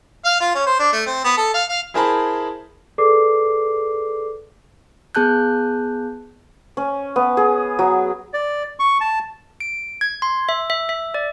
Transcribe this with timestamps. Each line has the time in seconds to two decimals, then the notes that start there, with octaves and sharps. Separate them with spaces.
0.25 F5
0.40 F4
0.54 C#4
0.66 C5
0.79 D4
0.92 A3
1.06 C4
1.24 B3
1.37 A4
1.54 F5
1.69 F5
1.94 E4 G#4 A#4 C5 A5 B5
2.98 G#4 A4 B4 D5 D6 C7
5.15 B3 G#4 A5 F#6 G6
6.77 C#4
7.16 B3
7.37 G#4
7.79 F#3
8.34 D5
8.80 C#6
9.01 A5
9.60 D7
10.01 G#6
10.22 C6
10.49 E5
10.70 E5
10.89 E5
11.14 D5